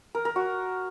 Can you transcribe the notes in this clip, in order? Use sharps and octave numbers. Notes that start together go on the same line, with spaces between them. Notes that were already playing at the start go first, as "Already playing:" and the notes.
A#4
A#4
F#4